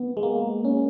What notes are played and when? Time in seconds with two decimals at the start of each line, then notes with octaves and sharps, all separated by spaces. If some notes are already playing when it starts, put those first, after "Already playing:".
Already playing: B3
0.17 G#3
0.23 A#3
0.65 C#4